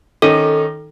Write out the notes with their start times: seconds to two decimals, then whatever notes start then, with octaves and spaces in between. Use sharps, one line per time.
0.22 D#3 C#4 D#4 A4